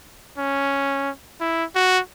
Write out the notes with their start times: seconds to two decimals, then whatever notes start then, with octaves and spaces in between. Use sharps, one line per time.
0.38 C#4
1.40 E4
1.75 F#4